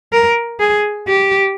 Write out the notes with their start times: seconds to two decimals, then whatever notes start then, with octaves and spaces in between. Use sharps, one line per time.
0.13 A#4
0.60 G#4
1.08 G4